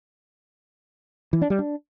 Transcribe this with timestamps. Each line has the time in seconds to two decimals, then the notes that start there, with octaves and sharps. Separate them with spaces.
1.33 E3
1.42 D4
1.50 G3
1.59 D4